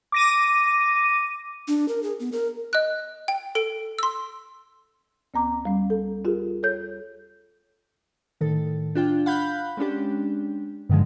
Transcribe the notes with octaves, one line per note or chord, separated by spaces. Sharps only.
D6 A#6 D#7
D4
A#4
G#4
B3
A#4
D#5 F#6
G5
A4 D7
C6 E6
D2 B3 A#5 D6
G3 C#4
A4
F4 G4 G#4 A#4
A4 C#5 G6
A2 D#3 A4
D4 F4 G5
F5 F#5 B5 F#6 G6
G#3 C#4 D4 G4
G2 D3 D#3 F3 G#3